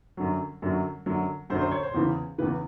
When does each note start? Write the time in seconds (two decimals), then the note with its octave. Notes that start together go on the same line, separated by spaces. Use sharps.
0.17 F#2 D3 F#3
0.62 F#2 D3 F#3
1.06 F#2 D3 F#3
1.50 F#2 D3 F#3 C5
1.61 C5
1.72 C#5
1.83 C5
1.94 E2 C#3 E3
2.38 E2 C#3 E3 B4